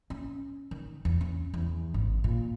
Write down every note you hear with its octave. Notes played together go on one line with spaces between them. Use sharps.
C#4
D#3
E2
C#4
E2
G#1
A#2